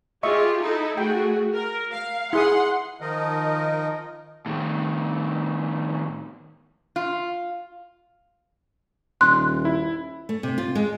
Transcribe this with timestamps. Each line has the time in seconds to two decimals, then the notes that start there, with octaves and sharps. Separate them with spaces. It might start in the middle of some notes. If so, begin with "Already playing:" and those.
0.23 F4 G4 G#4 D#5 E5 C#6
0.62 D#4 E4 A4
0.98 A3 F#4 G#4 G5
1.55 A#4
1.91 F5
2.33 E4 G#4 F#5 C6 D#6
3.01 D#3 F3 D#4 A#4 D#5
4.46 A2 D#3
6.96 F4
9.21 D#1 C6 F#6
9.65 E4
10.29 A3
10.43 C3
10.58 F4
10.75 G#3